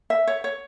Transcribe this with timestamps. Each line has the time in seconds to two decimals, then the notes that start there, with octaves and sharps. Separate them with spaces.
0.10 E5
0.27 C#5
0.44 C#5